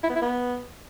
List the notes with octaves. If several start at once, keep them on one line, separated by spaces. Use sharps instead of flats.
E4
B3
E4
B3